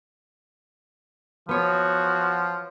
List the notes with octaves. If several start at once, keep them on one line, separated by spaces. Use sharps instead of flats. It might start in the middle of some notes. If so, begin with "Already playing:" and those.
F3 B3 F#4 C#5